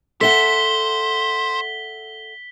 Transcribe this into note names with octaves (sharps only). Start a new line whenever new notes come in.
A4 C5 E5 F#5 B6 G7